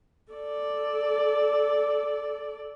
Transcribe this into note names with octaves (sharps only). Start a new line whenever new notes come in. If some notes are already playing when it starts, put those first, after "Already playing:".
A4 D5